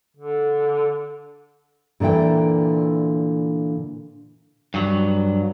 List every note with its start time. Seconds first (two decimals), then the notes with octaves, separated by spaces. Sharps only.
0.16 D3
2.00 A#2 D3 E3 E5 G5
4.74 G2 F#3